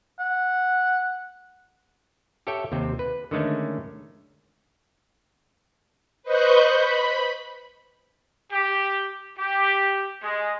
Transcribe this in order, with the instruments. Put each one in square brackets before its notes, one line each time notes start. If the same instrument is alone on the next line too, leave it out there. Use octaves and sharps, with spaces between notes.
[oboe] F#5
[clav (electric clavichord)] G4 A4 C#5 E5 G5
D#2 C3 C4
B4
D3 D#3 G#3 A3 C#4
[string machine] B4 C5 D#5 C#6 F#6 G6
B5
[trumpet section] G4
G4
G#3